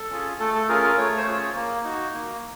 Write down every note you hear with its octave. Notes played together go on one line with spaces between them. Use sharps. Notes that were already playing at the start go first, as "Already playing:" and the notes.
Already playing: A4
C#4 F4 G#4
A3 A4
A4
C#4 F4 G#4 A#4
A#4
A3 C#5
C5
C#4 F4 G#4 C#5
A#3
D#4 F#4
A#3